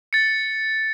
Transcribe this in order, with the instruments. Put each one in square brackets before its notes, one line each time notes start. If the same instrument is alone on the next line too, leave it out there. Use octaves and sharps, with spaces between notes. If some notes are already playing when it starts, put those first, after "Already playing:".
[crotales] A6 C#7